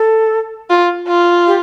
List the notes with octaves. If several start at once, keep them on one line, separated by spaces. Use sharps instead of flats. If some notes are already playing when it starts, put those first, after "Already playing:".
Already playing: A4
F4
F4
G4